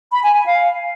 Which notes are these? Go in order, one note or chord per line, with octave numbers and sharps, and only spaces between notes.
B5
G#5
G#5
F5